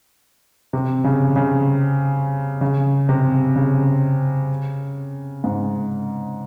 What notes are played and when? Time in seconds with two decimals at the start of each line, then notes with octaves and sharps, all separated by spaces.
0.73 C3
1.04 C#3
1.36 C#3
2.61 C#3
3.09 C3
3.56 C#3
5.44 G#2